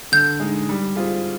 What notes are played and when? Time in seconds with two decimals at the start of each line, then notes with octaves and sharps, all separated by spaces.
0.12 D3 G6
0.40 G#3 D#4
0.69 G3
0.96 C4 F4 G#4